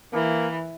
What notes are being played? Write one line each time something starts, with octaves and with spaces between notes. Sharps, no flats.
E3 A#3